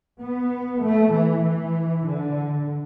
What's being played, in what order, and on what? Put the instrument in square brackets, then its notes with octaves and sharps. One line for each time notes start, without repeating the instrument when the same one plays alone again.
[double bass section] B3
A3
E3
E3
D3